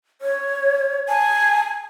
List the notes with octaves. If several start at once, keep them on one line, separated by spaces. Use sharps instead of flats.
C#5
G#5 A5